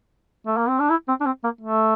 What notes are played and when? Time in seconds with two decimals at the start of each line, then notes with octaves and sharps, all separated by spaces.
0.46 A3
0.57 A#3
0.68 C4
0.80 D4
0.90 E4
1.08 C4
1.21 D4
1.26 C4
1.44 A#3
1.61 A3